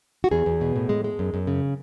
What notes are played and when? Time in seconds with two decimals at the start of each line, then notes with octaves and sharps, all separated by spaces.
0.24 F#4
0.31 E2 G#4
0.46 E2
0.61 B2
0.76 A2
0.89 G#3
1.04 G#3
1.19 F#2
1.34 F#2
1.47 C#3